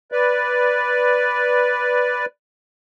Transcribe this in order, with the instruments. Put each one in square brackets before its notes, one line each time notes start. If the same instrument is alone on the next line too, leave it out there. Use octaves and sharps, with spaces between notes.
[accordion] B4 D5